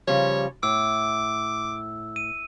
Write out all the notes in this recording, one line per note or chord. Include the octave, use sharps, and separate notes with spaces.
C#3 F3 G3 C#5
A2 D6 E6
D#7